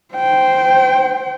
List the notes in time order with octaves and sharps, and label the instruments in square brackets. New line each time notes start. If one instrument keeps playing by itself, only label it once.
[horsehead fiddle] C5 G5